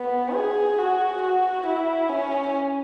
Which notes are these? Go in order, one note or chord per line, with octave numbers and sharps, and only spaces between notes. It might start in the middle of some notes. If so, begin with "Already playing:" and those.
Already playing: B3
G#4
F#4
F#4
E4
C#4